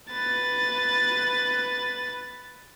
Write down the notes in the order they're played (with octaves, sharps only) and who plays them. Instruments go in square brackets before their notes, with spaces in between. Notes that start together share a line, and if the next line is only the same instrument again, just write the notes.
[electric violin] B4 A6